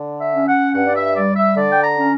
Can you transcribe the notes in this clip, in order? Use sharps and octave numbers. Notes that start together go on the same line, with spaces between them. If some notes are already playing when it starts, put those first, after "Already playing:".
Already playing: D3
E5
C#4
F#5
G2 F#5
D5
E5
G3 D5
E5
D3 D5
G5
A#5
C#4